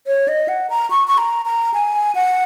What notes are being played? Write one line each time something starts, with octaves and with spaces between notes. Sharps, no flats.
C#5
D#5
F#5
A#5
C#6
C#6
A#5
A#5
G#5
F#5